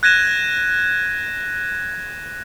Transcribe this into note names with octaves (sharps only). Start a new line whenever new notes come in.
F#6 G#6 A#6 D#7 E7